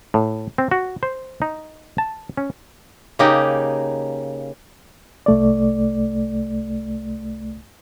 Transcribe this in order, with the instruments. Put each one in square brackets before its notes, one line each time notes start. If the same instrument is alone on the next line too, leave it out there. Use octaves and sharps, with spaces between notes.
[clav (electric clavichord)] A2
C4
F#4
C5
D#4
A5
C#4
[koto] C#3 A#3 D#4 G4 D#5
[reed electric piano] C2 A3 D5